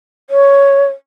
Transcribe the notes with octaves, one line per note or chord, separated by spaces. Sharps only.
C#5